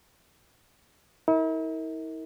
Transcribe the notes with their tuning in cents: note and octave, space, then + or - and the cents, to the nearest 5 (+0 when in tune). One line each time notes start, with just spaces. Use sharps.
E4 -45 A#4 -20